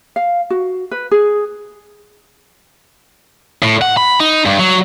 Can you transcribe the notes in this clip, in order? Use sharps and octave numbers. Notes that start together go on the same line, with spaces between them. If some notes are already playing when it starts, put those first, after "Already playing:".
F5
F#4
B4
G#4
A2
F#5
B5
D#4
G2
F#3